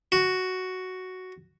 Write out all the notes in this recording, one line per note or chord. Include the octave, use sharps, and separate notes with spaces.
F#4